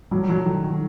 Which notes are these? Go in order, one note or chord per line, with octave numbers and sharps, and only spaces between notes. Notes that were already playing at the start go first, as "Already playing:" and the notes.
F#3 G3
F#3
D#3
D#3